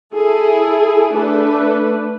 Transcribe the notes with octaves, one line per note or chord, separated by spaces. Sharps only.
E4 G#4 A4
A3 D4 B4